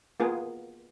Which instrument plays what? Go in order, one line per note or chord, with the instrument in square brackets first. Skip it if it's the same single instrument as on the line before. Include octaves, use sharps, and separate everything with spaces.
[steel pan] A#3 B3 F4 G#4